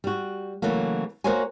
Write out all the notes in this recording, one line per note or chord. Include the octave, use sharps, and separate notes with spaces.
G3 F#4
C#3 E3 F#3 A3 A#3
A#3 F#4 A#4 C5 C#5 G#5